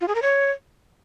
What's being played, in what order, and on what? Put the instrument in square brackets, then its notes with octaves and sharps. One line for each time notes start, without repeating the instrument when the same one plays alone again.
[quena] F4
G#4
A#4
C#5